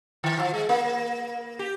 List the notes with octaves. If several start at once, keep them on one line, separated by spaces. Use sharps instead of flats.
D#3
F3
G#3
A#3
G4